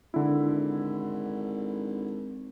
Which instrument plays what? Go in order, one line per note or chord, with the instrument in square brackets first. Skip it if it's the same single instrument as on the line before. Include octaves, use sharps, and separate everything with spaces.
[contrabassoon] G#1 [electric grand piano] D3 E4